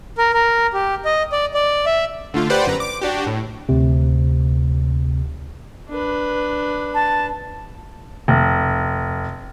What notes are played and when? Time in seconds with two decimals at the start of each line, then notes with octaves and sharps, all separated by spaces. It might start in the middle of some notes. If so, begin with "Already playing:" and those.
0.18 A#4
0.34 A#4
0.74 G4
1.05 D#5
1.32 D5
1.54 D5
1.86 E5
2.34 D3 A3 F4
2.50 G4 B4 C5 D5 F#5
2.66 G1 F#2 B4 A#5
2.80 D6
3.01 D4 F#4 G4
3.27 A2
3.69 D2 C3
5.89 D4 B4
6.94 A5
8.28 F1